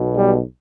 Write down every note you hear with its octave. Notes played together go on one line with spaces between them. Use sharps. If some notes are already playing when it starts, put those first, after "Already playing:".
Already playing: B1 B2
G3